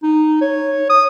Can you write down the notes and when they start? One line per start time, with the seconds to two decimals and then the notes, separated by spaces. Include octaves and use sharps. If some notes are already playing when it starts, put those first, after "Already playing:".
0.03 D#4
0.41 C#5
0.90 D#6